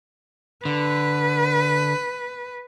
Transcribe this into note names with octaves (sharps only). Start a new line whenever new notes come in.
D3 B4